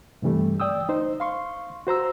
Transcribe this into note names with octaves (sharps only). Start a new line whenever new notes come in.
G2 C3 E3 G3 A3
D5 G5 D#6 E6
D#4 C5
F5 C6 C#6
F#4 C5 A#5 E6